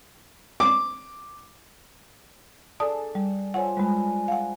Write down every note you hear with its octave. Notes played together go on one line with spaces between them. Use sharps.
D6
D4 G#4 A4 D5 A5 D#6
G3
F3 C#5 F#5 G#5 E6
G3 G#3 B4
F5 F#5